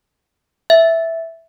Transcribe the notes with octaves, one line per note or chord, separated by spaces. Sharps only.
E5